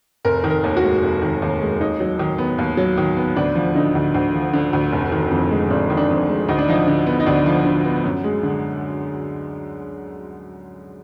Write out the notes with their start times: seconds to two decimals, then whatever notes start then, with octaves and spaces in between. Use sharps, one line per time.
0.25 F1 A#4
0.44 D#3
0.50 A#4
0.64 D#2
0.77 F#4
0.83 G#3
1.03 F1
1.22 D#3
1.42 D#2
1.61 G#3
1.80 D#2 D#4
2.00 F#3
2.19 D#3
2.38 B3
2.58 D#2
2.77 F#3
2.97 D#3
3.17 B3
3.36 D2 D4
3.55 F3
3.75 D3 D#4
3.95 D2
4.14 D2
4.34 F3
4.53 D3
4.73 D2
4.92 F1
5.12 D#3
5.31 F2
5.51 G#3
5.70 F1 D4
5.90 D#3
5.97 D4
6.10 F2
6.28 G#3
6.48 D2 D#4
6.58 D4
6.68 F3 D#4
6.88 D3
7.07 B3
7.20 D#4
7.26 D2 D4
7.46 F3
7.66 D3
7.85 B3
8.04 F#2
8.24 G#3
8.43 D3